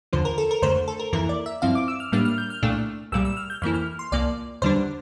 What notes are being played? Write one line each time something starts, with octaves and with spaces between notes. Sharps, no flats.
E2 D3 F3 C5
A#4
A4
A#4
F2 D3 A3 C5
A4
A#4
F2 E3 A#3 E4 A#4
D5
E5
G2 F3 C4 E4 F5
D6
E6
F6
A2 G3 A#3 D4 F6
F6
G6
F6
C2 A#2 A3 D4
C2 A#2 G3 E6
E6
F6
G6
F2 E3 A#3 E4 F6
F6
C6
C2 A#2 F3 A#3 D5
E2 D3 G3 D4 C5